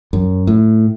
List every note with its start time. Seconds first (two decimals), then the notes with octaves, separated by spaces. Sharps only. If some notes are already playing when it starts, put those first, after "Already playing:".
0.13 F#2
0.47 A2